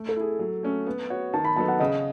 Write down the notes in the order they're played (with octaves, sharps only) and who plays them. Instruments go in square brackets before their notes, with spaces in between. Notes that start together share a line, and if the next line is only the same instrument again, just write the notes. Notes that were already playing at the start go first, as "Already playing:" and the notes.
Already playing: [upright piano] A3
[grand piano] A4
[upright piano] E4 G#4
F#3
A3 C#4
B3
F#4 C#5
[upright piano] D#3 [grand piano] A5
[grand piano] B5
[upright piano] F#3 B3 D#4 A4 [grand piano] A5
[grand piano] F#5
[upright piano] C#3 [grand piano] D#5